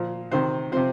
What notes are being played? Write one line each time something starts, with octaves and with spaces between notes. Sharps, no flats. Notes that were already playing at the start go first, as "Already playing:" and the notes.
Already playing: A#2 F3
C3 D#3 C4 C5
C3 F3 C4 C5